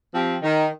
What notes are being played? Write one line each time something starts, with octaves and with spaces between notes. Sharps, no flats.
F3 C4 G4
D#3